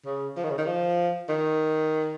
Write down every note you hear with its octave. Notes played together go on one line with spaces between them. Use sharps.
C#3
F3
D#3
C#3
D#3
F3
D#3